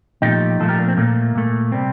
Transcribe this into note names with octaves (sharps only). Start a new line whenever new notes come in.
A#2 F3 A3 D#4 G4
A#2 F3 A3 F4 A4
G4 A#4
A#3 D4
C4
A#2 A3 A#3
A#2 A3
C3 G3 C4